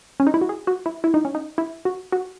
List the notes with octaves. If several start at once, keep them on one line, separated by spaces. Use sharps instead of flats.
C#4
D#4
E4
F#4
G#4
F#4
E4
E4
D#4
C#4
D#4
E4
F#4
F#4